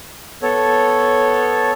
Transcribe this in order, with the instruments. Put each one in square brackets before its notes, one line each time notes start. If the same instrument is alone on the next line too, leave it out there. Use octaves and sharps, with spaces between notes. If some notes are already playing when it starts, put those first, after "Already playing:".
[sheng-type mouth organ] B3 A4 C#5